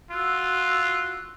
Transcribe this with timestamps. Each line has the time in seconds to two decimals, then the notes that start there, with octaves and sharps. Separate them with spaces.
0.11 F4 F#4 E6 F#6